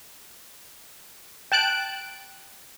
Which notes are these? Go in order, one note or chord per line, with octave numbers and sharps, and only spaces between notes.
G5 A5 F#6 D7